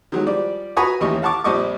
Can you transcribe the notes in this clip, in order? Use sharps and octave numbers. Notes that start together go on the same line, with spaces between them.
D#3 F#3 G#3
F3 G3 D5
F#4 B4 G#5 A#5 C#6 D#6
A1 D#2 G4 D#5 C#6
F5 F#5 A5 C#6 D6
A#1 G3 C4 D#5 C#6 D6